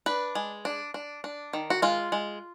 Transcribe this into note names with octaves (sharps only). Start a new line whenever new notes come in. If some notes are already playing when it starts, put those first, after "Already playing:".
D4 B4
G#3
D4
D4
D4
D#3
F#4
G#3 F4
G#3